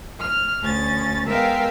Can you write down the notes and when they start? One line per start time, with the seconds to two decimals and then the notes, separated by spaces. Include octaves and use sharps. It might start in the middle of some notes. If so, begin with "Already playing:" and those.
0.20 F6
0.60 D2 C#4 A6
1.25 G#3 B3 A#4 E5 F5 G5